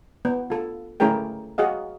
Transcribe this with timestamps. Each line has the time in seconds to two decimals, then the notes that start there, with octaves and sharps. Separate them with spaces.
0.25 B3
0.50 F4 A4
1.00 A3 C#4 E4 G#4 A#4 G5
1.58 F#4 G#4 D#5 F5